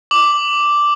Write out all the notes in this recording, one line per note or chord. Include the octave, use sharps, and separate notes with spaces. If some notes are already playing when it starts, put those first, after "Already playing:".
D6 F#7